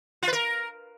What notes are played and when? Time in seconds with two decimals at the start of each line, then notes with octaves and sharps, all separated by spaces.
0.23 F4
0.28 B4
0.33 A#4